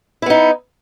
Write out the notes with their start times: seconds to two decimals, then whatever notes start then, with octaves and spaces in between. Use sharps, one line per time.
0.22 E4
0.26 B3
0.30 D#4